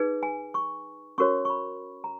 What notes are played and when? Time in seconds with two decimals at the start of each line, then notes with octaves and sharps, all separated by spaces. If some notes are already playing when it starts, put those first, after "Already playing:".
Already playing: D#4 G#4 B4
0.23 G#5
0.54 C#6
1.18 C#4 F#4 A#4 C#5 C#6
1.45 C#6
1.50 B5
2.04 A#5